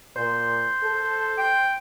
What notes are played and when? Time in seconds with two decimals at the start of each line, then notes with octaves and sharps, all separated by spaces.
0.16 A#2 C5
0.83 A4
1.38 G5